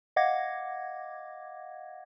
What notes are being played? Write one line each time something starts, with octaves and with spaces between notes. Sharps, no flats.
D#5 F5 F#5 D6 G#6 A#6